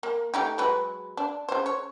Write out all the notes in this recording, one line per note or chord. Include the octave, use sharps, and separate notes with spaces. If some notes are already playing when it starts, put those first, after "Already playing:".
A#3
A3 D#4 G4
F#3 G#3 B4
D4
C#3 C5
C#5